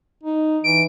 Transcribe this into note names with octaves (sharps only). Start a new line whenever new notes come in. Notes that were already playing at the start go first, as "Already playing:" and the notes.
D#4
E3 D7